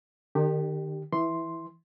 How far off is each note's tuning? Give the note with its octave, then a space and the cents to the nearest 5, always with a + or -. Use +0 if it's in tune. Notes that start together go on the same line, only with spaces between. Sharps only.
D#3 -35 D4 +45 G4 +0
E3 -5 C6 +0